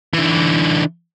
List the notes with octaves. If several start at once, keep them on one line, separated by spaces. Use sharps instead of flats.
D3 E3